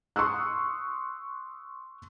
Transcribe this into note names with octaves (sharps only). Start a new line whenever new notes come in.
C6 C#6 D#6 E6 F#6